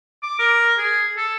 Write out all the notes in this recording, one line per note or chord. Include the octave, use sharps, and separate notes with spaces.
D6
A#4
G#4
A4